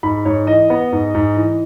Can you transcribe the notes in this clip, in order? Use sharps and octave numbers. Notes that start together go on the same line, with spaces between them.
G#2 B5
G#2 C#5
E3 D#5
B3
G#2
G#2
E3